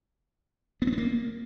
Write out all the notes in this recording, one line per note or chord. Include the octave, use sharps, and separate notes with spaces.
B3
C4
B3
A#3